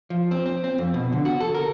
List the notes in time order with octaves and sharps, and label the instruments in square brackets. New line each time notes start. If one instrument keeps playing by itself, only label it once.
[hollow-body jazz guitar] F3
C4
C4
C4
F2
B2
D3
F#4
A4
A#4